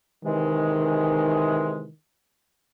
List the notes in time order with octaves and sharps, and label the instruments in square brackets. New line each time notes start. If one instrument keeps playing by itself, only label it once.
[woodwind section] C3 E3 G#3 [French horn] D#3